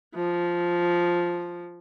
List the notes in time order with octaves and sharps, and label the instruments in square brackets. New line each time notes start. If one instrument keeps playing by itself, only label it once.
[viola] F3